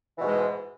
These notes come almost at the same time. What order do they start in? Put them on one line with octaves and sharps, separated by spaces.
E3 B2 G#2 G#3